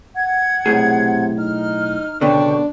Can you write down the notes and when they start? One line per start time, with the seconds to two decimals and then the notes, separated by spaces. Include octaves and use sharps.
0.15 F#5 G#6
0.66 B1 A2 C3 G#4
1.39 D#4 F6
2.21 C#2 B2 D3 D4 G5 C#6